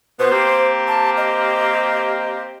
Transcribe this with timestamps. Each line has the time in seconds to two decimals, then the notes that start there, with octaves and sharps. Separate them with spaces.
0.19 B2 B3 C5
0.31 A#3 C4 G4
0.88 A5
1.17 D#5